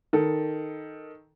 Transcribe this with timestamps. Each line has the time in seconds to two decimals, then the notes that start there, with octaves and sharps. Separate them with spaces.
0.13 D#3 A4